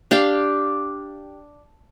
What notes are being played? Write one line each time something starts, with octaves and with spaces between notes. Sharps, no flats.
D4 G4 F5 G5